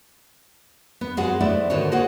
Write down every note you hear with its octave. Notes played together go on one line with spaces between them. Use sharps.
B3
F#2 G#3 C4 F#4 F#5 G#5
A3 B3 C4 E4 D5 E5
G#2 D3 D#3 F#4 C5 C#5
A#3 F#4 G#4 C5 C#5 F#5